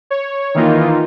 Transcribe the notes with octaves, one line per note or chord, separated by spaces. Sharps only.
C#5
D#3 E3 A#3 D#4 F4